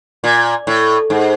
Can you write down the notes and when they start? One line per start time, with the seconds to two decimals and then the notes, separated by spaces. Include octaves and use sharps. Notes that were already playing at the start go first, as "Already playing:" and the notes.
0.24 A#2
0.67 A2
1.10 G#2